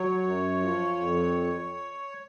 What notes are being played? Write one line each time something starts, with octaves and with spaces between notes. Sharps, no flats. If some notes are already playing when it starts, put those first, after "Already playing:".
Already playing: F#3 C#5
F#2
F3
F2